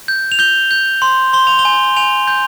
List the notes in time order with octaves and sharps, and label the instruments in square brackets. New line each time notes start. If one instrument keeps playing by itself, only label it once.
[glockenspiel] G6
F7
G6 G7
G6
C6
C6 G7
F7
G7
G#5
G#5 F7
G6